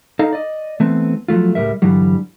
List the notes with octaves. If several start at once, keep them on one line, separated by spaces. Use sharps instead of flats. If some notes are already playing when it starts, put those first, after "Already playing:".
D#4 A4 D#5 F5 A#5
D5 D#5
E3 A3 B3 C4
F3 F#3 A3 F4
C#2 A2 G3 A#4 E5
G2 D3 E3 F#3 G3